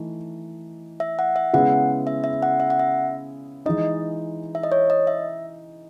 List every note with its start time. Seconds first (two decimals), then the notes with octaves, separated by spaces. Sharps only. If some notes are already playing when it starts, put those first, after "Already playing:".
Already playing: E3 A3 D#4
1.00 E5
1.19 F#5
1.36 E5
1.53 C#3 G#3 B3 E4 G#4 F#5
2.07 E5
2.24 E5
2.42 F#5
2.60 E5
2.70 F#5
2.79 E5
3.66 E3 G#3 D#4 D#5
4.55 E5
4.63 D#5
4.72 C#5
4.90 D#5
5.07 E5